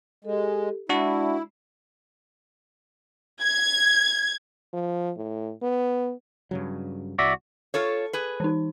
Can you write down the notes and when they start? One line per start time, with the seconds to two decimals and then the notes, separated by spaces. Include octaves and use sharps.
0.25 G#3 G4 A4
0.89 G#3 D4 E4 F#4 D5 A5
3.43 G#6
4.73 F3
5.17 A2
5.62 B3
6.51 G2 C#3 F#3
7.19 C2 F#4 D5 E5
7.74 F4 A4 C#5
8.13 G#4 B4
8.40 E3 D#4